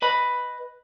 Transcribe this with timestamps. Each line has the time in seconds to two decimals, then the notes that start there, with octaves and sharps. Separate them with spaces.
0.02 B4 D#5 B5